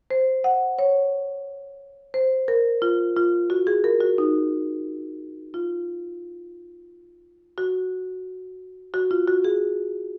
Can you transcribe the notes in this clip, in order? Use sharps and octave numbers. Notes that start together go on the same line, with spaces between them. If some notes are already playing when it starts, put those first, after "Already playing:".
C5
F#5
C#5
C5
A#4
F4
F4
F#4
G#4
A#4
F#4
D#4
F4
F#4
F#4
F4
F#4
G#4